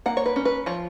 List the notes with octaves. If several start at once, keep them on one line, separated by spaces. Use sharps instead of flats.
A#3 F#5
C#5
B4
C#4
B4
F3 C#5